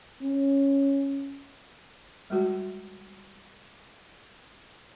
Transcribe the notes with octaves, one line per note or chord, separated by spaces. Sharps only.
C#4
G3 G#3 F#4